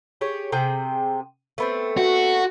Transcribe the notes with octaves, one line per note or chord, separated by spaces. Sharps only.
G4 G#4 C#5
C3 G#4 G5
A3 B3 C4
F#4